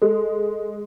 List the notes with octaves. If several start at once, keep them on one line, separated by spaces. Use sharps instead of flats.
G#3 A4